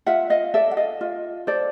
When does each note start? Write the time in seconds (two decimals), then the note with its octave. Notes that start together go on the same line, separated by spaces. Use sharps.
0.06 F4 E5 F#5
0.30 D#5 F5
0.54 A4 D5 E5
0.71 F#5
0.77 D#5 F5
1.01 F4
1.47 A4 C5 D5